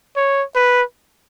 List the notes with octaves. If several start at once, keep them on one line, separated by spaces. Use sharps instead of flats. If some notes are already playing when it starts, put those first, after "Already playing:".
C#5
B4